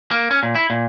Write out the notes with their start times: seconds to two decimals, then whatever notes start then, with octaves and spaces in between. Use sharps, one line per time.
0.11 A#3
0.31 C#4
0.43 A#2
0.55 E4
0.70 A#2